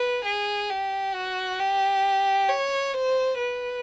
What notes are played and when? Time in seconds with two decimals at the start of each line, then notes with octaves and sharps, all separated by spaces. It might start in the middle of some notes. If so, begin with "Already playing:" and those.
Already playing: B4
0.25 G#4
0.70 G4
1.15 F#4
1.60 G4
2.49 C#5
2.94 C5
3.39 B4